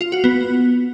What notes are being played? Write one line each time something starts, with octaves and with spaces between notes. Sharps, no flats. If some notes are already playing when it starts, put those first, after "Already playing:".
F4
F#4
B3